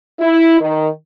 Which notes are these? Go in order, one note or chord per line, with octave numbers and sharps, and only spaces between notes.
E4
D#3